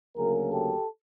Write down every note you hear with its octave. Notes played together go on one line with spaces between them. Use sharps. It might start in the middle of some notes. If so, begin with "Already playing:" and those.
D2 C#3 F#3 A#3 G#4 A#4
G4 A4